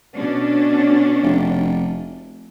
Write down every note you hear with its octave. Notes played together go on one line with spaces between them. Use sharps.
B2 C#4 D4
F1